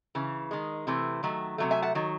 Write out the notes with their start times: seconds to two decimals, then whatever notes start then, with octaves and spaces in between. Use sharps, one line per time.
0.15 C#3 E3
0.51 D#3 G#3
0.87 C3 E3 A3
1.23 D#3 F#3 A3
1.58 C3 F#3 A3
1.71 E5 G#5
1.82 F#5 A5
1.95 D#3 F#3